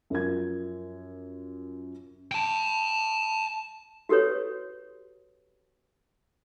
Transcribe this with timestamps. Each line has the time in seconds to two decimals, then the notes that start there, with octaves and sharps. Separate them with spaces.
0.10 F#2 F3 A#4 G#6
2.32 G5 A5
4.09 F#4 G4 A4 B4 C#5